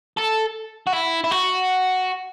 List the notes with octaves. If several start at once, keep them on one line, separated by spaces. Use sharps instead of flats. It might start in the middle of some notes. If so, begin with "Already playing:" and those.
A4
F#4
E4
E4
F#4